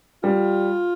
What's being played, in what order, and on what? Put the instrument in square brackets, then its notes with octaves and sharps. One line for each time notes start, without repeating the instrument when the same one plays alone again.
[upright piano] G3 [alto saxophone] F4